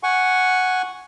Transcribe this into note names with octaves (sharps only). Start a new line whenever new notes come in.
F#5 G#5 C#6